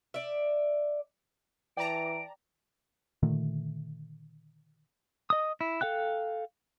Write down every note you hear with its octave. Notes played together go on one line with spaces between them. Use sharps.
D5 E5
E3 D5 G5 A5 A#5 D7
A#2 D3 D#3 A3
D#5 D#6
E4
A4 F5 G5 F#6